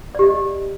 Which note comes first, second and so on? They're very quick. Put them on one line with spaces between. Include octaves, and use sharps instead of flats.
D5 G4 D#5